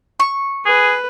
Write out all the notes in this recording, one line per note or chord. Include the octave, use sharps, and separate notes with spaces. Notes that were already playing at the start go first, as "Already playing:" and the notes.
C#6
G#4 B4